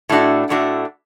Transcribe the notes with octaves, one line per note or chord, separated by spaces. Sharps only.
A2 A3 D4 F#4
A2 A3 D4 F#4